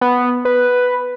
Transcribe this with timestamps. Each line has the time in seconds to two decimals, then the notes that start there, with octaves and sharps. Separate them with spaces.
0.01 B3
0.45 B4